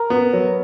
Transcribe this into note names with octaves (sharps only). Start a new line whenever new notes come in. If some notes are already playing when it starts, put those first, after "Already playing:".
Already playing: A#4
B3
F#3